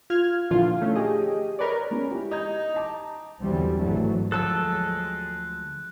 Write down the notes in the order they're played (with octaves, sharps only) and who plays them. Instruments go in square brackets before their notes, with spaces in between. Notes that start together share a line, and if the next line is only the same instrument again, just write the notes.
[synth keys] F4 F6 G#6
A#2 D3 E3 F3 F4
A3 C#4
G4 G#4 D#5
A#4 B4 C#5 D5
[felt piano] G#3 C#4
E4 G4
[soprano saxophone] D#4 [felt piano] D#6 G6 G#6
[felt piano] D#5 A5 D6
[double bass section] E2 D3 E3 F#3 G3 C4
G#1 E3 F#3 A3
[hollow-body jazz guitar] D2 F3 F#3 [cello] G#3 [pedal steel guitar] A4 A5 E6 [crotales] F#6